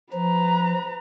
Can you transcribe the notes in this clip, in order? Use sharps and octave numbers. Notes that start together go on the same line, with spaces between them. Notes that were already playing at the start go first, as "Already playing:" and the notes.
F3 B4 A#5